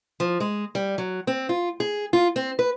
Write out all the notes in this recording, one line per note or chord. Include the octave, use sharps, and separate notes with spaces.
F3
G#3
G3
F#3
C4
F4
G#4
F4
C4
B4